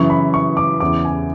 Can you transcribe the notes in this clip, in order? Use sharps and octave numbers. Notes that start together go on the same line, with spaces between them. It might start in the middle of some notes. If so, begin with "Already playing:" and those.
Already playing: F#2 C#3 E3 C#6
B5
C#6
D6
E2 C#3 E3 D6
G#5